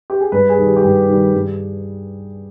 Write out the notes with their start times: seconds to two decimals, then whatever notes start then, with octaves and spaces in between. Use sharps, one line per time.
0.10 G4
0.21 G#4
0.32 G2 B4
0.49 G#4
0.58 D#3 G3
0.66 G4
0.76 G4
0.83 G2 G#4
1.09 D#3 G3
1.34 G2